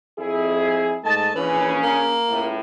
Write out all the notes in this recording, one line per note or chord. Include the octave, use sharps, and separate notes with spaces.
F2 E4 G#4
G#2 A3 D#5 A5
A#1 C#3 E3 C#4
A#3
C#2 A2